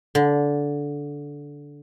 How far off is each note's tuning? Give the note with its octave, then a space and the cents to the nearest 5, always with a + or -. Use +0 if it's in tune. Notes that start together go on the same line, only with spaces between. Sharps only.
D3 -15